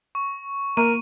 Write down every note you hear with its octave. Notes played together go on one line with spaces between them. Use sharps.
C#6
A#3 A#4 D#7